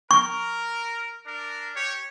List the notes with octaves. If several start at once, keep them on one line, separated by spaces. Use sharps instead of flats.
A#4 C#6
D4 A#4
G4 C#5